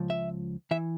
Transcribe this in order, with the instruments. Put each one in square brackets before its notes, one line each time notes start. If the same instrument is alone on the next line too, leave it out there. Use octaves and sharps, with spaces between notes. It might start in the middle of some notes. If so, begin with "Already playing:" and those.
Already playing: [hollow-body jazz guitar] C#2 F3
E5
E3 E5